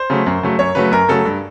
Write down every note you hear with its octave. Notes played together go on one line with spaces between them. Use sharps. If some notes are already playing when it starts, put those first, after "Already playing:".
Already playing: C5
C#3 F#3 A3
F#2
C#3 F#3 A3
F#2 C#5
C#3 F#3 A3 B4
F#2 A#4
C#3 F#3 A3 A4
G2